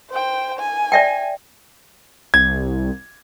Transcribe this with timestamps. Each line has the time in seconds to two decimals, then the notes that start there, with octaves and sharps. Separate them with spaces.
0.10 C5 G5
0.59 G#5
0.92 D5 E5 G5
2.34 C2 G#6